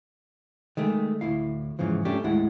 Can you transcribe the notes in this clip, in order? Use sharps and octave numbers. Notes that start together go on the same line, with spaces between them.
D#3 G#3 A3
D2 A2 E4 F5
E2 G#2 C#3 E3 F3
G3 A3 C#4 D4 G4
D#2 A2 G#3 E4 F#5